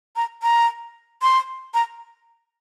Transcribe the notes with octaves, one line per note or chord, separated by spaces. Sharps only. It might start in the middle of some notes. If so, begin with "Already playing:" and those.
A#5
A#5
C6
A#5